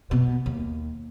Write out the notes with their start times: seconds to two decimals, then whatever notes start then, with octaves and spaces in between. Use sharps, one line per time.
0.11 B2
0.46 D#2